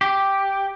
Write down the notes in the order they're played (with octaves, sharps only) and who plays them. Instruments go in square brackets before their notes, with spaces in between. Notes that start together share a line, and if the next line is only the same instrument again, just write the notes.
[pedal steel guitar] G4